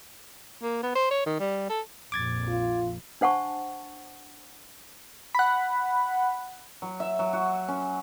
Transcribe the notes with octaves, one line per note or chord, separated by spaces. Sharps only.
A#3
B3
C5
C#5
D#3
G3
A4
A#1 F2 A#2 D6 G#6 A6
F4
D4 C5 F#5 A5 C#6
F#5 B5
F#3
E5
F#3
F#4
C#4